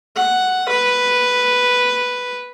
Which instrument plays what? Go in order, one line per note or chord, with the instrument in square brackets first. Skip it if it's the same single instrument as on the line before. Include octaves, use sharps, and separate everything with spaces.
[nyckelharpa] F#5
B4